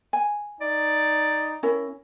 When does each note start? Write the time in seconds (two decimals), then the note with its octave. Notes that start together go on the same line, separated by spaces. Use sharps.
0.13 G#5
0.61 D#4 D5
1.63 C#4 E4 A#4